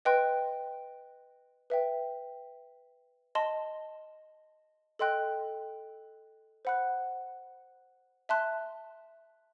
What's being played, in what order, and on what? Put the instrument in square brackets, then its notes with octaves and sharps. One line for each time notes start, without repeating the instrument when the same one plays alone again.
[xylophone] B4 D#5 G5 C6 F#6
B4 E5 G5
D#5 A5 C6
A4 D#5 G5 C6 F#6
C5 F#5 B5 F#6
E5 A5 C6 F#6